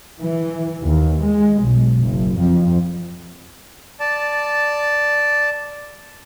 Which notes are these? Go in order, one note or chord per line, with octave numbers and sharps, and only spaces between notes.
E3
D#2
G#3
B1
F#1
F2
D5 A5